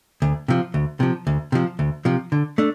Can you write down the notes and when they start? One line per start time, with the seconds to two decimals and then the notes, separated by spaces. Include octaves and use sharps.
0.22 D2
0.48 C3 F3
0.74 D2
1.00 C3 F3
1.27 D2
1.52 C3 F3
1.79 D2
2.05 C3 F3
2.32 D3
2.58 A3 D4